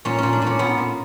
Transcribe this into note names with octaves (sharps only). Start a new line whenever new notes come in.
A#2 C#4
A#2 C#4
D4
A#2 C#4
A#2 B3
A#2